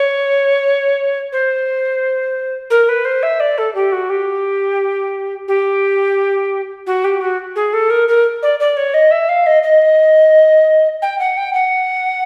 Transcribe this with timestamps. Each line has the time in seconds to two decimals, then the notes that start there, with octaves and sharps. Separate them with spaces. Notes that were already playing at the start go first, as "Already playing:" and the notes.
Already playing: C#5
1.32 C5
2.70 A#4
2.89 B4
3.05 C5
3.23 E5
3.40 D5
3.58 A4
3.75 G4
3.92 F#4
4.10 G4
5.48 G4
6.87 F#4
7.04 G4
7.21 F#4
7.56 G#4
7.73 A4
7.90 A#4
8.08 A#4
8.43 D5
8.60 D5
8.77 C#5
8.94 D#5
9.11 E5
9.29 F5
9.46 D#5
9.63 D#5
11.02 G5
11.19 F#5
11.37 G5
11.54 F#5